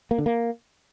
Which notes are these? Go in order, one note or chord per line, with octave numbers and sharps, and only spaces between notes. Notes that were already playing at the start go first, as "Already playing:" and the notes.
A#3
D3
A#3